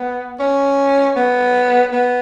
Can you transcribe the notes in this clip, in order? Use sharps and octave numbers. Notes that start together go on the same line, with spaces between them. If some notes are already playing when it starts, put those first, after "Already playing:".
Already playing: B3
C#4
B3
B3